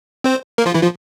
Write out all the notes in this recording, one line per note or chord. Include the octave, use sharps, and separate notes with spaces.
C4 C5
A#3 A#4
F3 F4
E3 E4
F3 F4